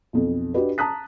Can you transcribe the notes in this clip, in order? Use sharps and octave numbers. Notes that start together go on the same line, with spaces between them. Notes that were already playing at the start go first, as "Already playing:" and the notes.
B1 F2
D4 F#4 G4 B4 D#5
A5 A#5 D#6 F#6 B6